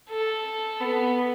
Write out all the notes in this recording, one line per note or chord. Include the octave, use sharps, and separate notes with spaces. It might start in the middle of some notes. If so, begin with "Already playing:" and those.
A4
B3